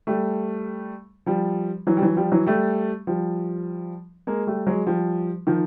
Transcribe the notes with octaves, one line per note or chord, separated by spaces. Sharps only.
G3 A3
F3 G3
E3 F#3
G3
E3 F#3
F3 G3
E3 F#3
G3 A3
F3 G3
G#3 A#3
G3 A3
F#3 G#3
F3 G3
D#3 F3